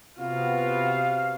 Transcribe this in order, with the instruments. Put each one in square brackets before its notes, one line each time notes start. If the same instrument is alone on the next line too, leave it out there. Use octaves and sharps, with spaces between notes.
[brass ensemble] C3 B3 [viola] F4 F#4 [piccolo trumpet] F5